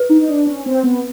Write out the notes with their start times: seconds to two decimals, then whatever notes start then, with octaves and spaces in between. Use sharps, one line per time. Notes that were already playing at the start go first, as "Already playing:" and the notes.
Already playing: B4
0.09 D#4
0.21 D#4
0.28 D4
0.47 C#4
0.66 C4
0.83 B3